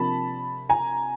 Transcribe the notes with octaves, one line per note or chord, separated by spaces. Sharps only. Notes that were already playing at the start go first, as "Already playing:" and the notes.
Already playing: C3 F3 A#3 D4 A5 B5
G#5 A#5